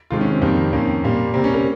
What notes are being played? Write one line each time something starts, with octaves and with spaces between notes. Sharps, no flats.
C3 D#3 G#3 F4
C#4
C4
F2 D#3 G3 A#3
F2 D#3 A#3 C#4
A#2 G3 A#3
C3 G3 A#3 C4
C#4
A#4